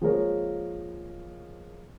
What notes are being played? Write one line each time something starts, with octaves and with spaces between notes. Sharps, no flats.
F3 G#3 A#3 A#4 C#5